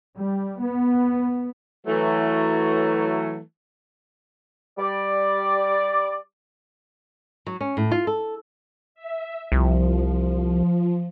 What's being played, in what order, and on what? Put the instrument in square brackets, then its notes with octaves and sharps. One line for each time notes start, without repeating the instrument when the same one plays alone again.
[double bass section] G3
B3
[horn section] E3 F#3 A3
[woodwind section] G3 D5
[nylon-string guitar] F#3
C#4
A2
F4
A4
[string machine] E5
[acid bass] C2 [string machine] F3